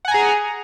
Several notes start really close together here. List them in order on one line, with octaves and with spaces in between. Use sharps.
F#5 G#5 A#5 G#4